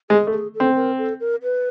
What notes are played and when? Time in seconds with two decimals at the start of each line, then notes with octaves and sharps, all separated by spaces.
0.10 G#3 G#4
0.27 A3
0.32 G#4
0.55 A4
0.60 C4
0.76 A#4
0.98 A4
1.20 A#4
1.43 B4